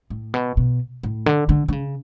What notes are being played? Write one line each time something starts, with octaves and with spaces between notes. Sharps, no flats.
A2
B2
B2
A2
D3
D3
D3
C#3